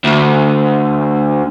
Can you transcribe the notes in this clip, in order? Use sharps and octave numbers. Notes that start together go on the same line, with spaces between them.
D2